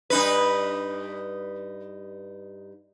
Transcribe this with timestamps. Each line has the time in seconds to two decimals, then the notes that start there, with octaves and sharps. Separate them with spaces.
0.10 G2 D#4 B4